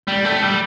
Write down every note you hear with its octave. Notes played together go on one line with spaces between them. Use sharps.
G3
A3
G3